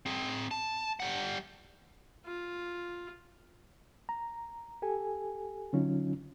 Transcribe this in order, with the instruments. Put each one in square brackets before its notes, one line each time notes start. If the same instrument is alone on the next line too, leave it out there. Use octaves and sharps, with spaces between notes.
[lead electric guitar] C4 G#4
A5
G3 F#5
[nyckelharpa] F4
[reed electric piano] A#5
G4 A4 G#5
D3 F#3 C#4 D#4 F4